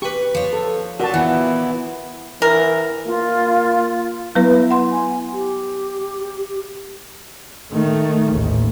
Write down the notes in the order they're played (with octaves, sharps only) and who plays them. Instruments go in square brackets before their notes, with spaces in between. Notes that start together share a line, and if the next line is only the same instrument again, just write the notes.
[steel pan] G4 [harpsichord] B4 C#6
[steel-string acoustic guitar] F3 C#5
[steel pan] A4
[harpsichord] A#2 [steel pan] F#4 A5
[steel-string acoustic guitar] E3 [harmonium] B3 E4 [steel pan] F#5
[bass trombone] E3 [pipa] A#4
[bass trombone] A#3 [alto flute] F4
[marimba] F#3 B3 B4 [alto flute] E4
[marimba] F#5 C6
[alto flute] G#5
G4
[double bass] D#3 A3
A1 D#2